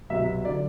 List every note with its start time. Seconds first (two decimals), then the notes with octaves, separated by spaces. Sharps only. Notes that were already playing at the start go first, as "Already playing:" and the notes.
0.10 C2 B2 F#3 E5
0.45 D3 F#3 D5